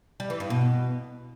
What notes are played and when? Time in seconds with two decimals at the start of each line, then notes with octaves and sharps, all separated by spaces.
0.20 G3
0.30 E3
0.40 G2
0.50 B2